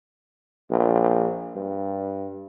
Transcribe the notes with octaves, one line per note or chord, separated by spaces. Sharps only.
A#1
G2